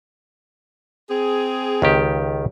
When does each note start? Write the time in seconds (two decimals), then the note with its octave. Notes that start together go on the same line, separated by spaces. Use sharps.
1.10 C4 G#4
1.82 C#2 D#3 G4